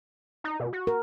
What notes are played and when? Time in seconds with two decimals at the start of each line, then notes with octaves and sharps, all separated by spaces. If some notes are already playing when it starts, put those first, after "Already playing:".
0.44 D#4
0.60 B2
0.73 F#4
0.87 A#4